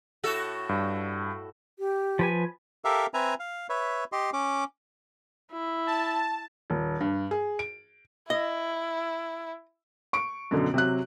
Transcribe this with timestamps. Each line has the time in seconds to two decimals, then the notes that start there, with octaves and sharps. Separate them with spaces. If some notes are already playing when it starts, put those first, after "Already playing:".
0.24 A2 F#4 A4
0.69 G2
1.79 G4
2.19 F3 B4 G#5
2.85 G4 A4 A#4 E5 F5
3.14 C4 B4 E5 G#5 A#5
3.40 F5
3.69 B4 C#5 E5
4.12 G4 D#5 C6
4.33 C#4 D6
5.52 E4
5.87 A5
6.70 D#1
7.01 G2
7.31 G#4
7.59 D7
8.30 E4 D#5
10.13 C#6 D7
10.51 F#2 B2 D3
10.74 C3 F#3 F#6